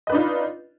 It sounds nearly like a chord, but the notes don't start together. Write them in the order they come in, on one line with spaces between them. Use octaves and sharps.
D#5 B4 D4 D#4 F4